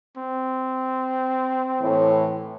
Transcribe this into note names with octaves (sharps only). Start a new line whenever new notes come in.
C4
A2 E3